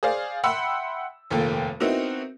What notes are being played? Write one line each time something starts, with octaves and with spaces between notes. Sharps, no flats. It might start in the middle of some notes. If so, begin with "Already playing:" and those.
G#4 C5 D5 F5
E5 F#5 G5 B5 C6 E6
F1 D#2 A#2 A#3 A4 G5
B3 C4 D#4 E4 F#4 A#4